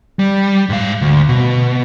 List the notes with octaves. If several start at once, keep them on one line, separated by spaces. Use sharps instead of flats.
G3
G#2 F5
D2
B2